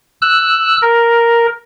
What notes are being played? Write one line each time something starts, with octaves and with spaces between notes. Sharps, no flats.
E6 F#6
A#4